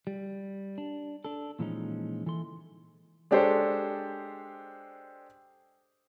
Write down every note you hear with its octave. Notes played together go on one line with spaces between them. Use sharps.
G3
D4
D4 A4
A#2 E3 F3 G#3 C#4 D#4
E3 A4 C6
G#3 D4 G4 A4 C5 C#5